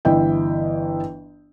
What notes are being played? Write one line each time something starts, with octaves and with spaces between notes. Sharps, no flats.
G1 E3 E4 D#5 G5